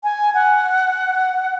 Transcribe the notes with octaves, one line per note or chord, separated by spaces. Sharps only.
G#5
F#5